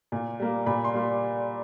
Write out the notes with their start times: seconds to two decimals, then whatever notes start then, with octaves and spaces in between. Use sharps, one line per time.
0.12 A#2
0.40 G3 A#3
0.66 A#2 B5
0.84 C6
0.94 G3 A#3